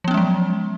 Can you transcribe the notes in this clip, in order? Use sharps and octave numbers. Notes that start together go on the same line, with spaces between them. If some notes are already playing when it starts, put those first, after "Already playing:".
F3 F#3 G#3 B3 C#4